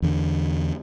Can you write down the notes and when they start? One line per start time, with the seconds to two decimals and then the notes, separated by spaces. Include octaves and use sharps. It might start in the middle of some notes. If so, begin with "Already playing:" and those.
0.02 E2 D3